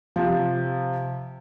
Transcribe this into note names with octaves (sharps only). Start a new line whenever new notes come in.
C3 F3